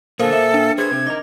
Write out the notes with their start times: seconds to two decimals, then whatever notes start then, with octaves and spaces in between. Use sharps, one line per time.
0.20 A#2 D3 A4 A#4 C5 F5
0.33 A#2 E5
0.54 D4
0.78 G#4 B4 C5 G#6
0.91 C3 C4
1.07 D#4 A#4 D6